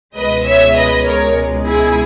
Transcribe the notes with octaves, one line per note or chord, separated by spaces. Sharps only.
C#2 B2 G#3 B4 D#5
C#5 E5
B4 D#5
A#4 C#5
E4 G#4